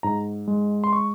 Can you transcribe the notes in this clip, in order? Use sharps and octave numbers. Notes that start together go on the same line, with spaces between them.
G#2 A#5
G#3
C6
C#6